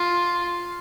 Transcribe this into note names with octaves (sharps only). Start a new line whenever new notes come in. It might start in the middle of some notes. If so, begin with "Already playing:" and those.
Already playing: F4